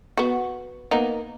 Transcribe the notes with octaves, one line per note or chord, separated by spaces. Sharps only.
B3 F#4
A#3 B3 D#4